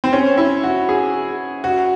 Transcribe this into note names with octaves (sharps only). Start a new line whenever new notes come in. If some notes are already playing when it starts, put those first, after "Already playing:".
C4
C#4
E4
F#4
G#4
F#4